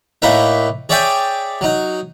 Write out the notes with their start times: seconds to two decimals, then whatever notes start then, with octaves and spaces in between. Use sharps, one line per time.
0.22 A2 A#3 D#4 B4 E5
0.89 G#4 C#5 D5 E5 G5 G#5
1.61 F#3 D#4